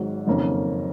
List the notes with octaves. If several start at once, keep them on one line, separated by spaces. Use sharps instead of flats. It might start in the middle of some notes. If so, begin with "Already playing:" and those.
Already playing: G#1 G#2 F#3
F#1 F2 D#3 A#3 C#4